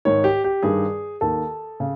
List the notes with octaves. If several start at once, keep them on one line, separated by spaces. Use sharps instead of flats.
G#2 D#3 C#5
G4
G4
G2 D#3 G#4
D#2 D#3 A4
C#3